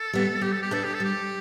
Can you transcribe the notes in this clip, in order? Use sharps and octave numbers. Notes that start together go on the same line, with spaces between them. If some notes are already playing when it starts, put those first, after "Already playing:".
Already playing: A4
G3 B3
G3 G4
A4
G4
D4 A4 B4 D5
G4
A4
G3 G4